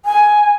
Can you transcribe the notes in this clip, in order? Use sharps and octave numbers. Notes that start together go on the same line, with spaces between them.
G#5